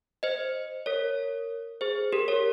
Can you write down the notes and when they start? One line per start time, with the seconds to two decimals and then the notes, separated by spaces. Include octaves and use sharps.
0.23 C5 D#5
0.86 A#4 C#5
1.81 G#4 C5
2.12 G4 A#4
2.28 A#4 C#5